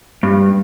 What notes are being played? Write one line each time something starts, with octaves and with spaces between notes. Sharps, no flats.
G2